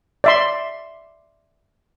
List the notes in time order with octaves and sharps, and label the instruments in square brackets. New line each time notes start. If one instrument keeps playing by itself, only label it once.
[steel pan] D5 E5 C6